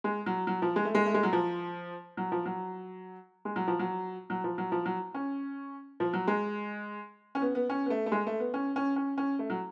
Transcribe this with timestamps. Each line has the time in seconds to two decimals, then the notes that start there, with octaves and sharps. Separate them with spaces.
0.04 G#3
0.26 F#3
0.47 F#3
0.62 F3
0.76 G#3
0.85 A3
0.95 G#3
1.06 A3
1.14 G#3
1.23 F#3
1.33 F3
2.17 F#3
2.32 F3
2.46 F#3
3.45 G#3
3.56 F#3
3.68 F3
3.79 F#3
4.30 F#3
4.44 F3
4.58 F#3
4.72 F3
4.86 F#3
5.14 C#4
6.00 F3
6.13 F#3
6.27 G#3
7.35 C#4
7.42 B3
7.55 B3
7.70 C#4
7.86 B3
7.90 A3
8.06 A3
8.12 G#3
8.27 A3
8.40 B3
8.54 C#4
8.76 C#4
8.96 C#4
9.18 C#4
9.39 A3
9.50 F#3